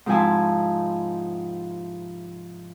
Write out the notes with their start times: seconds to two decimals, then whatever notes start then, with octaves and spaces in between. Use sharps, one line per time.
0.06 G#2 C3 F3 E4 G#5 A5